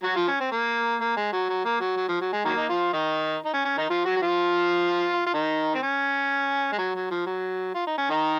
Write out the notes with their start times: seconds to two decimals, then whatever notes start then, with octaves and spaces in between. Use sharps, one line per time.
0.04 F#3 F#4
0.16 F3 F4
0.28 C#4
0.40 C4
0.52 A#3
1.01 A#3
1.17 G#3
1.33 F#3
1.49 F#3
1.65 A#3
1.81 F#3
1.97 F#3
2.08 F3
2.21 F#3
2.33 G#3
2.45 D#3 F#3 A#3
2.57 D#4
2.69 F3 F4
2.93 D#3 D#4
3.45 D#4
3.54 C#4
3.65 C#4
3.77 D#3 D#4
3.89 F3 F4
4.05 F#3 F#4
4.17 F#4
4.21 F3 F4
5.27 F4
5.33 D#3 D#4
5.75 C4
5.83 C#4
6.72 G#3
6.78 F#3
6.95 F#3
7.11 F3
7.26 F#3
7.74 F4
7.87 D#4
7.98 C#4
8.09 D#3 D#4